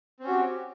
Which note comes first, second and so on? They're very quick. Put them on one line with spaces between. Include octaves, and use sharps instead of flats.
C4 C#4 F#4 G4